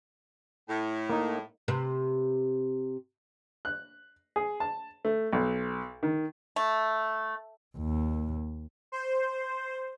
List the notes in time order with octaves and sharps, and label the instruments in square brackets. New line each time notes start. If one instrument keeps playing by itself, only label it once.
[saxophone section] A2
[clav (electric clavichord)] A#3 D#4
[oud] C3 B4
[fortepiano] F#6
G#4
A5
A3
B1
D#3
[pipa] A3
[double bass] D#2
[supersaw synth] C5